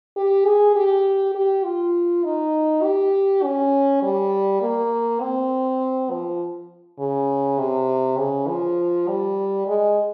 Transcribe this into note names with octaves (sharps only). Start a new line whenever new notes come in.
G4
G#4
G4
G4
F4
D#4
G4
C#4
G3
A#3
C4
F3
C#3
C3
C#3
F3
G3
G#3